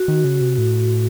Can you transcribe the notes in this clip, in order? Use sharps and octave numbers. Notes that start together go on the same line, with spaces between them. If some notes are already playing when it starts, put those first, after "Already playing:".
Already playing: F#4
D#3
C#3
C3
A2